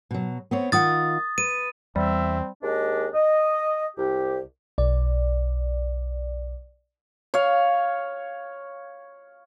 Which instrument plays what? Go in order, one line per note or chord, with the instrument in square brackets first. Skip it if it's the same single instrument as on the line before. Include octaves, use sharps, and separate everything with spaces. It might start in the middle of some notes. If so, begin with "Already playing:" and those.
[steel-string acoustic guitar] B2 F#3
B3 C4 C#5
[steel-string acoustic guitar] D#3 F4 F#5 [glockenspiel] D#6 A6
[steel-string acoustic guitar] B4 [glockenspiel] D#7
[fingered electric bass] E2 [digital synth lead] G3 [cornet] C4 [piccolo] E5
[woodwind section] D#2 G#3 D4 D#5
D#5
C2 G4
[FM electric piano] B1 D5
[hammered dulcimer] C#5 F5